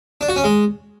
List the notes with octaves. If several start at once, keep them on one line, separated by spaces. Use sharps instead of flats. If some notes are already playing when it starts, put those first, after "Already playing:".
D4
F#4
C#4
G#3